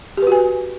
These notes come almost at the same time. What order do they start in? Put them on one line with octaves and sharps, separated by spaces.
G4 B4 F#4 G#5